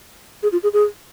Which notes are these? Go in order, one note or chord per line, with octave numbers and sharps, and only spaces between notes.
G#4
F4
G#4
G#4